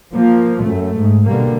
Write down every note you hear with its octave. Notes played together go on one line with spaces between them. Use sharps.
F3 A#3
F#2 A3
G#2
B2 D3 G3 A#3